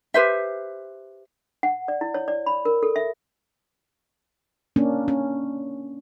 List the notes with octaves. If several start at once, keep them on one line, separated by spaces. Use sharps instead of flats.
G4 B4 C5 E5
F#5
D5
E4
C#5
D5
B5
A#4
A4
E5
A#3 C#4 D4
C#4